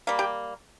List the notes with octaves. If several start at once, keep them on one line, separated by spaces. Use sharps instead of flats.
G3 A#3
G4 G5